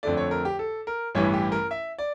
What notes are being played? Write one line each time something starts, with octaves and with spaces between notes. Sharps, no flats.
F2 D3 A3 D5
C#5
A#4
G4
A4
A#4
A1 G2 E3 C#5
G4
A#4
E5
D5